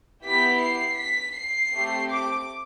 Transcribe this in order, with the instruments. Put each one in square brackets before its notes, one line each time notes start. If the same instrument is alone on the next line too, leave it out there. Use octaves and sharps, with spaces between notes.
[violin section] B3 E4 G4 B6
C7
B6
C7
A3 C4 G4
D6